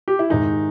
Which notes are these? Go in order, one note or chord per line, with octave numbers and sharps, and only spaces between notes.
G4
E4
G#2 D#3 G#3 D#4